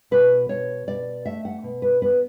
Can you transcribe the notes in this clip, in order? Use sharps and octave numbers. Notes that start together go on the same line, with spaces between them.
B2 B4
B2 C#5
B2 D5
A3 E5
F#5
B2
B4
B3 B4